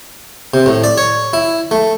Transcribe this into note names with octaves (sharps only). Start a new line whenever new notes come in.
C3
A2
D5
C#5
E4
A3